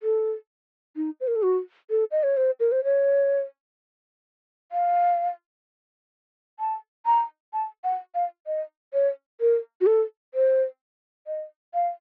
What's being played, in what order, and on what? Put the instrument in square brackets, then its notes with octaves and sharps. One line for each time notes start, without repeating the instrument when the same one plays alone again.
[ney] A4
D#4
C5
A#4
A4
F#4
A4
D#5
C#5
C5
A#4
C5
C#5
F5
A5
A#5
A5
F#5
F5
D#5
C#5
A#4
F#4
A4
C5
D#5
F5